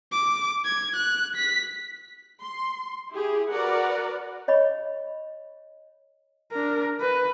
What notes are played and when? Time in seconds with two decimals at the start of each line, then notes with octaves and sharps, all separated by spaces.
0.12 D6
0.65 G#6
0.96 F#6
1.36 B6
2.41 C6
3.11 E4 G4 G#4
3.50 F#4 A#4 B4 D5 F#5
4.48 C#5 D#5 B5 C#6
6.52 D4 A#4
7.01 B4